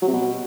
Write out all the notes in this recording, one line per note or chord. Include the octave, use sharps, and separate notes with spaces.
F#3
C3
B2